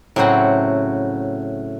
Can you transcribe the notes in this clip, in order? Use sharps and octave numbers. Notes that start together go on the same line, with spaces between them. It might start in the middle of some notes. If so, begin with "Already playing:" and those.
A2 C#3 F#3 C4 F#4 F#5